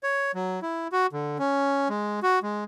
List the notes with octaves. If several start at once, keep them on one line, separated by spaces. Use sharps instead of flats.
C#5
F#3
E4
F#4
D3
C#4
G#3
F#4
G#3